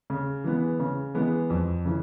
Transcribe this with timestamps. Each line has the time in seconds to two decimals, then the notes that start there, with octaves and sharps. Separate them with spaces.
0.10 C#3
0.44 E3 G#3 B3
0.80 C#3
1.15 E3 G#3 B3
1.50 F2
1.85 C#3 E3